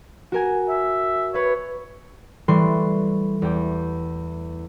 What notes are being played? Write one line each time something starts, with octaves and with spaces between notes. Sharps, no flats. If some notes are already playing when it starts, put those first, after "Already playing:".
F#4 A#4 G#5
E5
B4 C#5 E5
E3 G3 A3 C6 C#6 F#6
E2 G4